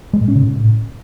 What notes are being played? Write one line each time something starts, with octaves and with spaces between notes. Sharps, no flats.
G#3
A2
C#4
C#3
A2